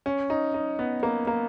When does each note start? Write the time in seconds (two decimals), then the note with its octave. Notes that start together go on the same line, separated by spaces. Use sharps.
0.06 C#4
0.30 D#4
0.54 D#4
0.79 B3
1.03 A#3
1.27 A#3